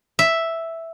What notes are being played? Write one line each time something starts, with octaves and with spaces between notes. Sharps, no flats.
E5